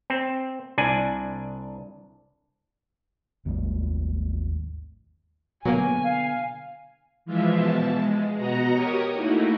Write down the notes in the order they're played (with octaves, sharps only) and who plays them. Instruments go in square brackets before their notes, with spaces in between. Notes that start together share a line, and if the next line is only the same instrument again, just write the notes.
[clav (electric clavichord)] C4
C2 D4 G#5
[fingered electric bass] G#1 D#2 G3 A3
[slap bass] B2 D3 [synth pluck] F#3 A#3 [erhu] G#5
[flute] F5
[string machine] E3 F3 G#3 F4 E5
B2 E3 F3 A5
G#3
B2 F#4 D#5 F#5 A#5 A#6
G4 A#4 C#5 D#6
A3 A#3 D#4 E4 F#4